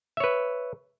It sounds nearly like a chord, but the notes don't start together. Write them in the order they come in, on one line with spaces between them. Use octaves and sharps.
E5 C#5 B4